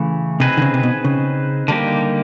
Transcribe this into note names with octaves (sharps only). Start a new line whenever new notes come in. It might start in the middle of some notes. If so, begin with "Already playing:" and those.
Already playing: C#3 E3 A3
C3 C4 D#4 G#4 B4
D3
C#3
C3
B2
C#3
D3 G3 A#3 D#4 G4